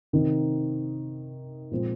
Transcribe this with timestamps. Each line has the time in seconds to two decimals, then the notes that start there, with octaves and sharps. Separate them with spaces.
0.13 C3 D#3 C4 D#4
1.71 A#2 F3 G#3 C4